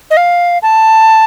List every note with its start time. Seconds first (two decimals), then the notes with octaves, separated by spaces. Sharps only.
0.11 D#5
0.17 F5
0.63 A5